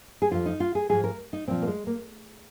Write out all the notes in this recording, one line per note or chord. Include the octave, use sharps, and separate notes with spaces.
G#4
F2 F3 F4
D#4
F4
G#4
G#2 F3 G#4
A#4
D#4
A#2 F3 C4
A#3
G#3
A#3